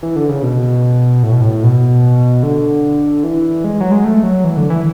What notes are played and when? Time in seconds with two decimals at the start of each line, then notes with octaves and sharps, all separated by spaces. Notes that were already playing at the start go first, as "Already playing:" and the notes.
0.03 E3
0.16 D3
0.29 C#3
0.43 B2
1.23 A2
1.32 B2
1.41 A2
1.64 B2
2.43 D3
3.24 E3
3.64 G#3
3.81 F#3
3.92 G#3
4.04 A3
4.24 F#3
4.44 E3
4.57 D3
4.70 E3